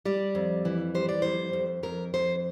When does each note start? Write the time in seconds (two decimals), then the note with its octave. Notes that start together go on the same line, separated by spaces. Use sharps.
0.05 G3 D5
0.35 F2
0.65 E3
0.95 G3 C5
1.09 D5
1.22 F2 C5
1.53 F2
1.83 F2 A#4
2.14 F2 C5